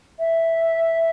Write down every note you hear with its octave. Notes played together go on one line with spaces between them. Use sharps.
E5